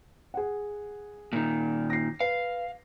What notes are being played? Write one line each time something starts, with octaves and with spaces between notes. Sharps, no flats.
G#4 F#5
A#2 D#3
A#6 C7
B4 F5